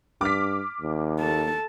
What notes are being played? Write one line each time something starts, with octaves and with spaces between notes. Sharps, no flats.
G2 D6 F6 B6
D#2
A4 A5